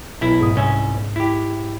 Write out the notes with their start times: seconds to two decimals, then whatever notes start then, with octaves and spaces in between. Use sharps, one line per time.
0.21 B1 E4
0.40 G#2 D#6
0.56 C2 C#4 E5
1.16 E4 G4